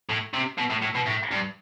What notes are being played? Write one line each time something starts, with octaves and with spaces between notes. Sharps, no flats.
A2
C3
B2
A2
A2
B2
A2
G2